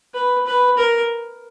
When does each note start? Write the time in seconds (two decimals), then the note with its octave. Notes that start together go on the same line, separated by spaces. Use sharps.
0.14 B4
0.46 B4
0.77 A#4